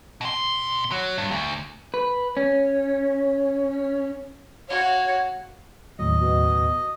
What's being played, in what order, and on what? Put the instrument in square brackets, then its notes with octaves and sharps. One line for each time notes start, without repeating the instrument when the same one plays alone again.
[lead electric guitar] B2 C6
F#3
G2
D2
[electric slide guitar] B4
C#4
[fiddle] F#4 F5 [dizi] C#5
[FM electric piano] D#2 A2 F#3 [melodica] D#5
[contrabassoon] B2